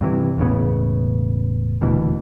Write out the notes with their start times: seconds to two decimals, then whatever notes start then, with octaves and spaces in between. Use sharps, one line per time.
0.01 G2 C3 D#3 E3
0.38 E1 A1 C#3 B3
1.81 D#1 D2 B2 E3